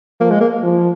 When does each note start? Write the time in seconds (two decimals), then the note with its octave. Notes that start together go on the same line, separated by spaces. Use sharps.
0.20 F3 A#3
0.31 G#3
0.41 A#3
0.63 F3